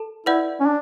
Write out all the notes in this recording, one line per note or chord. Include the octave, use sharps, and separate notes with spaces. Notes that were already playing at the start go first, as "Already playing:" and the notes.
Already playing: A4 A5
E4 B4 D5 F#5
C#4
D4